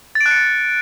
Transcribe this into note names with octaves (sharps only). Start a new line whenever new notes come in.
A6
D7
F#6
C#7
A6